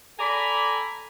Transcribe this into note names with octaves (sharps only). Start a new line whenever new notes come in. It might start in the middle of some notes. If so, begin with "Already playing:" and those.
A4 D5 G#5 A#5 B5